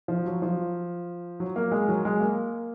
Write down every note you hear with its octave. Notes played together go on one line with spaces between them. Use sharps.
F3
F#3
F3
F#3
A#3
G#3
F#3
G#3
A#3